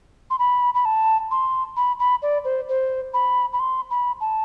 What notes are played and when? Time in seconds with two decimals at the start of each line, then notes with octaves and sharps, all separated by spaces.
0.30 C6
0.39 B5
0.74 B5
0.85 A5
1.31 C6
1.76 B5
1.99 B5
2.22 D5
2.45 C5
2.69 C5
3.14 B5
3.53 B5
3.60 C6
3.91 B5
4.21 A5